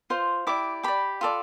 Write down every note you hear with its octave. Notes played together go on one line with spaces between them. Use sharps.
F4 C5
E4 G4 D5 D6
G4 D5 B5
F4 A4 D5